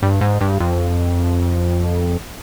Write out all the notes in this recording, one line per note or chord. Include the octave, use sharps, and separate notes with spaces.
G2
G#2
G2
F2